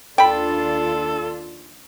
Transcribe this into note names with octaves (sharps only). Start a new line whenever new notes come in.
D#2 D4 F4 A4 G5 B5